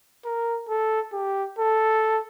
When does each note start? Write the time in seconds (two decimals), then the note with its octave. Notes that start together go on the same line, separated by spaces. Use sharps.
0.25 A#4
0.69 A4
1.13 G4
1.59 A4